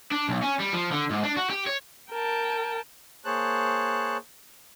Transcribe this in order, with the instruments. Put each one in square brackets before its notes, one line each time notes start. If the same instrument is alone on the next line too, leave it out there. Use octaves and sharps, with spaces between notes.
[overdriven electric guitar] D4
B1
C#4
G3
F3
D3
G#2
D4
F#4
G4
C#5
[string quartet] A#4 G5 A5
[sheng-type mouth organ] A#3 G#4 C5 C#5 A5 F#6